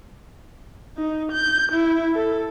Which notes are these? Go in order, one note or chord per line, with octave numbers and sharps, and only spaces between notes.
D#4
G6
E4
A4